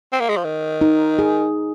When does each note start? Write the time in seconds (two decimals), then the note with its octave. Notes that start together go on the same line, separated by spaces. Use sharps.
0.12 C4
0.20 A#3
0.29 G#3
0.37 F3
0.44 D#3
0.81 D#4
1.19 G#4